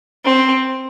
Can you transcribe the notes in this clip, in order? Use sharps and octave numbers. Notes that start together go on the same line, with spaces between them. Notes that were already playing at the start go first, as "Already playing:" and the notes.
C4